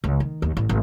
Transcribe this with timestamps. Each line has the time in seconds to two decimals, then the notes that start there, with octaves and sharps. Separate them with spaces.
0.04 C#2
0.20 D#3
0.42 D#2
0.57 A1
0.69 G#1